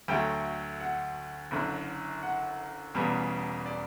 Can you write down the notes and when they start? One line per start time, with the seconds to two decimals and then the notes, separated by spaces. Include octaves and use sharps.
0.08 D2 D3 F#3 A3 G5
0.80 F#5
1.51 F#1 F#2 D3
2.23 F#5
2.95 E1 E2 C#3 G3 B3
3.66 D5